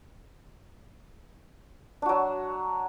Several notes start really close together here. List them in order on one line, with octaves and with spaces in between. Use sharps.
D4 F#4 F#3